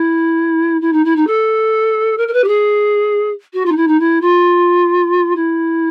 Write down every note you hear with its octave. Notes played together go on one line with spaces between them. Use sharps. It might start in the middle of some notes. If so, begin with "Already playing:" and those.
Already playing: E4
E4
D#4
E4
D#4
A4
A#4
A#4
B4
G4
G#4
F#4
F4
D#4
E4
D#4
E4
F4
E4